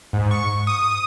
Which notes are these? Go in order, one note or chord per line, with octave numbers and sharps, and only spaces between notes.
G#2
C#6
D#6